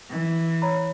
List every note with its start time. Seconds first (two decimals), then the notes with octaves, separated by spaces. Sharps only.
0.11 E3
0.62 C#5 A#5 B5